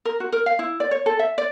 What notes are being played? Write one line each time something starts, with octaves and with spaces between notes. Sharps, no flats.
A#4
F#4
A#4
F5
E4
D5
C#5
A4
E5
D5